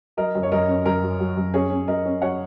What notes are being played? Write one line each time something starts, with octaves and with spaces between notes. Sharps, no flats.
F#3 A#4 D#5
F#2
C#5
F#2 A#4 D#5
C#4
F#2 A#4
F#3
F#3
F#2
C#4 G#4 C#5
C#4
F#3 A#4 D#5
C#4
F#3 C#5 F#5